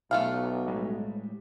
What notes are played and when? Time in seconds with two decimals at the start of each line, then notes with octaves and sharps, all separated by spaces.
0.11 B1 B2 A3 B3 F4 F5
0.67 A2 G3 G#3